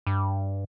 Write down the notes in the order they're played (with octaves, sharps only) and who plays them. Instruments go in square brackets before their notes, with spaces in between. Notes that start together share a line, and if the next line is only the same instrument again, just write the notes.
[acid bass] G2